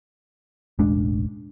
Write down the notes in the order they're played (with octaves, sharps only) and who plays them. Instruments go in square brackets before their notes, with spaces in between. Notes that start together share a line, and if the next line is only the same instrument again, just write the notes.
[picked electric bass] E1 A1 G#3 D4